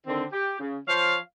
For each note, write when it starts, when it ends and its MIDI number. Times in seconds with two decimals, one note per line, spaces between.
0.06 0.23 50
0.06 0.23 51
0.06 0.23 60
0.32 0.58 67
0.60 0.77 49
0.88 1.15 53
0.88 1.15 72
0.88 1.15 73
0.88 1.15 77